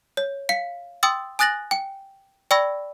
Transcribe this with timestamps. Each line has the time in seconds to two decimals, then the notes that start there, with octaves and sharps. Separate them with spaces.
0.17 C#5
0.49 F5 B6 C#7
1.03 G5 C6 D#6 E6 A6
1.39 G#5 D#6 F#6 A6 A#6 F#7
1.71 G5 C#7
2.51 D5 G5 B5 C#6 E6 A#6